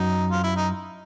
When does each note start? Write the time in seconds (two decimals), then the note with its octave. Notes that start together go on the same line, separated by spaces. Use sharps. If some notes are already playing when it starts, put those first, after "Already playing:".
Already playing: F#2 D#4
0.31 F4
0.44 E4
0.56 D#4